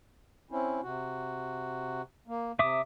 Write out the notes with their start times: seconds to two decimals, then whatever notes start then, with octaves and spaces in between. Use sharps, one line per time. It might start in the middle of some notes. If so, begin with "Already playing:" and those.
0.51 C4 C#4 E4
0.83 C3 F#4
2.28 A#3
2.59 C3 E5 D6 D#6